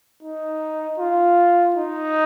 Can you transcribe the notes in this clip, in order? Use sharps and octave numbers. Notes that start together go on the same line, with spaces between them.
D#4
F4
D#4